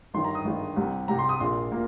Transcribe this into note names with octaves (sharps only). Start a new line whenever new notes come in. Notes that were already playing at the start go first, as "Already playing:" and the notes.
G1 G2 D#3 C6
A#5
D#6
G1 G2 D#3
C2 C3 G3
C2 C3 G3 A#5
C6
D#6
A#1 A#2 A#3 C6
A#2 A#3